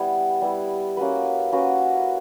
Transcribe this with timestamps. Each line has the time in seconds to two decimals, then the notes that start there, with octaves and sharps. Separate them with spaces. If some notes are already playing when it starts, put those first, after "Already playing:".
Already playing: G3 B3 E4
0.41 G3 B3 E4
0.97 A#3 C#4 F#4 B4
1.52 A#3 C#4 F#4 B4